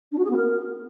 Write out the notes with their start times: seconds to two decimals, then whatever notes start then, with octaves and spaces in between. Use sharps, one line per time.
0.12 D4
0.18 F#4
0.24 G#4
0.30 B3
0.36 A#4